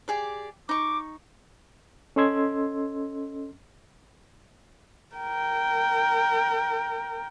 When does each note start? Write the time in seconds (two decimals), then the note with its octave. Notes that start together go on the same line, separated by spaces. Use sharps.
0.08 G4 G#4 D5
0.69 D#4 C#6 D6
2.16 C#4 A4 D#5 C6 E6 G#6
5.15 A#4 G5